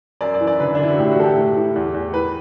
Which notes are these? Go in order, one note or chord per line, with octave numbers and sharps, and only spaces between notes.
F#2 D5
D5
E3
D5
D3 B4
D4
D3 E4
F#4
A2 G4
F#4
E3 A4
G4
A2
E3
E2
E2
E3 B4